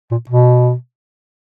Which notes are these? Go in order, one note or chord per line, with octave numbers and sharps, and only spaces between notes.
A#2
B2